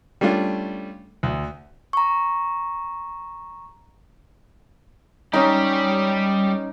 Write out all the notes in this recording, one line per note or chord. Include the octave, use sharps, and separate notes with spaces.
G3 A3 C#4 D4 F4
D2
A#5 C#6
G3 C#4 D#4 G4